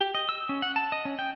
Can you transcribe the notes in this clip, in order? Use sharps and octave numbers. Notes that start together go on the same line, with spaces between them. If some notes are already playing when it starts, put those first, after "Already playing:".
G4
D#5
E6
C#4
F#5
A5
D#5
C#4
G5